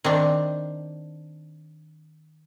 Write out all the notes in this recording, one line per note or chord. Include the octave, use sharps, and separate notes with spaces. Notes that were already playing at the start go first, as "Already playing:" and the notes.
D#3 C4 D4